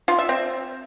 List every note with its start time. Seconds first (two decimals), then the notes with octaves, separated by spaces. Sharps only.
0.08 F4
0.18 E5
0.29 C4